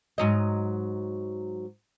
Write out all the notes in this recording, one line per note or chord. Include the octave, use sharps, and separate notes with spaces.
G#2 F#3 D#5